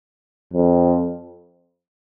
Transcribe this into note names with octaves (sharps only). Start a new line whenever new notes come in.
F2